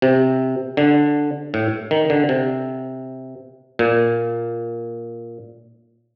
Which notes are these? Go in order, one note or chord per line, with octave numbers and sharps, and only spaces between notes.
C3
D3
A2
D#3
D3
C3
A#2